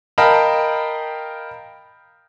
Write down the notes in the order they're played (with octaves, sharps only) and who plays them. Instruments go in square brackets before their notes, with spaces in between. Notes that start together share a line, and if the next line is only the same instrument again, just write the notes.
[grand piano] A#4 D#5 F5 G5 A5 B5